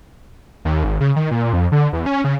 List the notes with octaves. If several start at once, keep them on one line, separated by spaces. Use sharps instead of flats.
D#2
G#1
C#3
D#3
A#2
F2
D3
E2
C#4
C#3